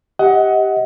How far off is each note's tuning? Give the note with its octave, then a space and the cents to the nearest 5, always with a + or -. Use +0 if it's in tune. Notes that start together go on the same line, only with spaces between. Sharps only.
G4 +0 D#5 +30 F#5 +5